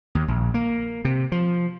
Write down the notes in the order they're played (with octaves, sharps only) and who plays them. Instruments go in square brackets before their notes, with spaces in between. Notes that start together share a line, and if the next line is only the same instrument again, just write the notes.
[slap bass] D#2
A#1
A#3
C3
F3